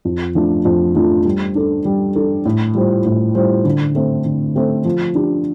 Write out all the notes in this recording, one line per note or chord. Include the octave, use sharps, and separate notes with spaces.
F2
F3 A3 D4
F2
F3 A3 D4
G3
D4 A4
G3
D4 A4
A2
G3 F4 C5
A2
G3 F4 C5
D3
A3 C4 A4 C5
D3
A3 C4 A4 C5
F3
D4 G4